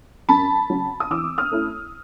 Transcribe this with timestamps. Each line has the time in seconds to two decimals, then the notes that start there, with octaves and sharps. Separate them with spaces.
0.29 F#2 A5 B5
0.70 C#3 F#3
1.00 D#6
1.11 E3 D6 E6
1.38 D#6 F6
1.52 A3 C#4 E4